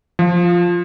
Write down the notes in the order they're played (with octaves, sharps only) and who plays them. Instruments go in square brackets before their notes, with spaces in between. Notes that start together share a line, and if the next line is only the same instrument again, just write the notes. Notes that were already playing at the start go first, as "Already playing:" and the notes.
[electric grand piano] F3